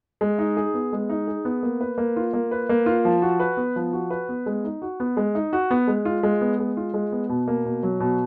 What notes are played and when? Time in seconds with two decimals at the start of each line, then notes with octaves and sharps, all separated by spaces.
0.21 G#3
0.38 D#4
0.57 G#4
0.74 B3
0.93 G#3
1.09 D#4
1.27 G#4
1.45 B3
1.63 A#3
1.81 B4
1.98 A#3
2.16 F4
2.33 A#3
2.51 B4
2.69 A#3
2.86 F4
3.05 F3
3.22 F#4
3.40 B4
3.57 B3
3.76 F3
3.93 F#4
4.10 B4
4.29 B3
4.46 G#3
4.64 D#4
4.82 F#4
5.00 B3
5.17 G#3
5.35 D#4
5.53 F#4
5.71 B3
5.87 G#3
6.05 F4
6.23 G#3
6.41 B3
6.59 G#3
6.77 F4
6.94 G#3
7.12 B3
7.29 B2
7.48 A#3
7.65 B2
7.83 F#3
8.00 B2